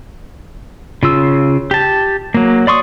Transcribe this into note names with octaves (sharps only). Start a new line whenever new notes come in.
C#3 F4 E6
G4 A5
F#3 A#3
D5 C6 C#6 D#6